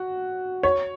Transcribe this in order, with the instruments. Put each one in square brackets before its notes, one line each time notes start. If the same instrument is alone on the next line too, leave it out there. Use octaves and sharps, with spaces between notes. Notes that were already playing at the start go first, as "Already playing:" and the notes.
Already playing: [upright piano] F#4
C#5